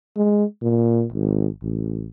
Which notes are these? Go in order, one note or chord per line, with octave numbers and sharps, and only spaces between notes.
G#3
A#2
G#1
A1